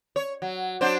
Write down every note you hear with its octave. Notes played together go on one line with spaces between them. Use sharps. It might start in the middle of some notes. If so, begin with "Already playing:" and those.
C#5
F#3
F#3 D4 C5